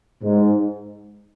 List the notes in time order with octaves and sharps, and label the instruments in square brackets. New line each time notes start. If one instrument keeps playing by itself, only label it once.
[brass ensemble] G#2